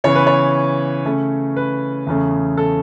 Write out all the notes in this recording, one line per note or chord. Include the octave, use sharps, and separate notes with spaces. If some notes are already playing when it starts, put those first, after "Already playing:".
C#3 E3 B3 C#5
B4
C#5
C#3 A3 C#4
B4
E2 C#3 A3 C#4
A4